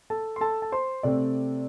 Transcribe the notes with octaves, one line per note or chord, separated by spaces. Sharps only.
A4 A5
C6
A4 A5
A5
C5 C6
C3 A3 C4 D5